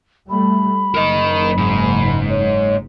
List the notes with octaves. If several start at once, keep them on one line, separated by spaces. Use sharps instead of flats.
G3 A3 B5
F#1 A#4 D#5
G#2
C#5